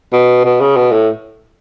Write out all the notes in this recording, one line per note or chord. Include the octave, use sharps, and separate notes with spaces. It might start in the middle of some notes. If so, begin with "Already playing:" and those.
B2
B2
C#3
B2
A2